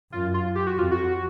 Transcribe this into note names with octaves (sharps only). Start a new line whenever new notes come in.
F#2 F4
F4
G4
F#4
F2 F4
F#4